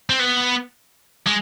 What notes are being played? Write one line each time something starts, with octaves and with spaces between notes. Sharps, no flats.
C4
B3
G#3